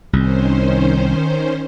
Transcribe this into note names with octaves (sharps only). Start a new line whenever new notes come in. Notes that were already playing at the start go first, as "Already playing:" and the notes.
C2 D#3 C#4 C5